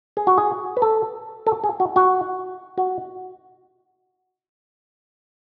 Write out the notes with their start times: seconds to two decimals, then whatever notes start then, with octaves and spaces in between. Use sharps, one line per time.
0.17 G#4
0.27 F#4
0.38 G#4
0.77 B4
0.82 A4
1.47 A4
1.64 G#4
1.80 F#4
1.96 F#4
2.78 F#4